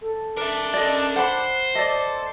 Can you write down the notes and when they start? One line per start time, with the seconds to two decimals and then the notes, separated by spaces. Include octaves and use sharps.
0.01 A4
0.37 D4 A#4 E5
0.74 A4 D5 D#5
1.16 C5 F#5 B5 F#6
1.75 A4 D5 D#5 D6